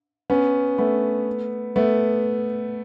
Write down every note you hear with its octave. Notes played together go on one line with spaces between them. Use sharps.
B3 C#4
A3 B3
A3 B3